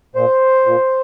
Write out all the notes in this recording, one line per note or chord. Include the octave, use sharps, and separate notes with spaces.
A#2 C5
A#2